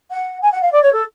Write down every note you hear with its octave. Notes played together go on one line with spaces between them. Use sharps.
F#5
G#5
F#5
F5
D5
C#5
A4